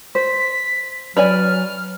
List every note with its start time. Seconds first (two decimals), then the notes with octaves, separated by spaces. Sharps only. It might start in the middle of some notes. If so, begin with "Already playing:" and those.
0.15 C5 B6
1.17 F#3 B4 C#5 D5 G#5 F6